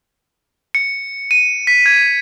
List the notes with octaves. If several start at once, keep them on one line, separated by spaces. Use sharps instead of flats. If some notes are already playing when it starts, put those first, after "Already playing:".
C#7
D#7
B6
G#6